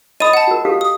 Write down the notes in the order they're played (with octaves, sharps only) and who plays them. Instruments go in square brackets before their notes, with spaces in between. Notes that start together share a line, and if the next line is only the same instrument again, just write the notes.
[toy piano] D#5 B5 [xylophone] D#6 D#7
[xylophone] F#5 A5
[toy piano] F#4 A#4
G4 A4 F5
[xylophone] D#6